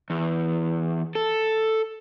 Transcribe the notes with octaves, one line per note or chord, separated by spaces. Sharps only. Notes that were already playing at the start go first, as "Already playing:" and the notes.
E2
A4